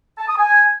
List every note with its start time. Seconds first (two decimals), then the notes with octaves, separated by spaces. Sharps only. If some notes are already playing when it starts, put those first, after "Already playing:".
0.18 A5
0.28 D#6
0.38 G#5